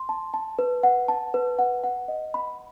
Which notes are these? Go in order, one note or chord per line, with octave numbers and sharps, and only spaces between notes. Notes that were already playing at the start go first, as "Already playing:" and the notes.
Already playing: C6
A5
A5
B4
F#5
A5
B4
F#5
F#5
D#5
B5